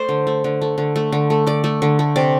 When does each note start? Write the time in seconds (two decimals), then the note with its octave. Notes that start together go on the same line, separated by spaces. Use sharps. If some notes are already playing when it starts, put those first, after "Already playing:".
Already playing: A3 A4 C5 D5
0.09 D3
0.27 A3
0.44 D3
0.61 A3
0.78 D3
0.96 A3
1.12 D3
1.30 A3
1.47 D3 D5
1.64 A3
1.82 D3
1.99 A3
2.16 C3 D5